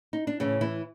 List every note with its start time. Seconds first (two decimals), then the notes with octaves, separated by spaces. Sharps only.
0.13 D#4
0.27 D4
0.40 A2 C#3 E3 C#4
0.61 E3 E4